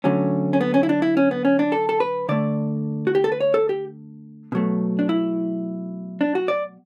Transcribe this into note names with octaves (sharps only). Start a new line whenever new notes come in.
D3 F#3 A3 C#4
C#4
B3
C#4
E4
D4
E4
C#4
B3
C#4
D4
A4
A4
B4
D3 A3 D5
F#4
G4
A4
B4
C#5
A4
G4
B2 F#3 A3
D4
E4
D4
F#4
D5